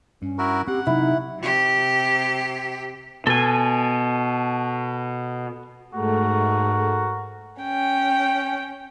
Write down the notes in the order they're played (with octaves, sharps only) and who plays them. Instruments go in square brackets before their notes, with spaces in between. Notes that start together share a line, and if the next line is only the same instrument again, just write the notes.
[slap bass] G2 [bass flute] C#4
[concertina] E4 F#4 A#4
[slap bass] C4 [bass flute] G4 [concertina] F#5
[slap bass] C3 F#3 [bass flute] D#4 [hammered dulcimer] E4
[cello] C3 G4
[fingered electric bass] B2 [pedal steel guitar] A4 G#5
[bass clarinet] G#2 [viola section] G#3 A3 [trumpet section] F#4 A#4
[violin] C#4 G5